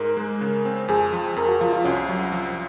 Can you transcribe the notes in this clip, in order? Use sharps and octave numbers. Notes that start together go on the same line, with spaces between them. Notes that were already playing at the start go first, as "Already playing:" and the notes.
Already playing: G#2 G#3 A#4
G#3
C#3
C4
F2 G#4
F3
F2 A#4
F#4
F3 F4
F4
C2 C#4
F#3
F3